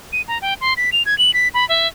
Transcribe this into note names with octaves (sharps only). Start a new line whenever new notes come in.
D#7
A#5
G5
C6
B6
F7
G#6
F#7
B6
B5
E5